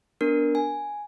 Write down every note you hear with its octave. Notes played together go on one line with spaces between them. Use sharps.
B3 D4 A#4
G#5